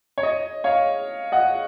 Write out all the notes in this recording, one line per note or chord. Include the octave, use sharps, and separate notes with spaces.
C#5
D#5
C#5 F5
D#5 F#5